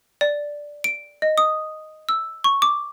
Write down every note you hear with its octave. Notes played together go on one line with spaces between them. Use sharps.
D5
D7
D#5
D#6
E6
C#6
D6